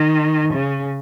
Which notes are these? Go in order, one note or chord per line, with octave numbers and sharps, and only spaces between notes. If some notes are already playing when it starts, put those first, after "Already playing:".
Already playing: D#3
C#3